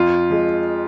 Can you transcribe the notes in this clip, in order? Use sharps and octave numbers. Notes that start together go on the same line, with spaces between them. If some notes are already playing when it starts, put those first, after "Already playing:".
Already playing: F2 F4
F3 G#3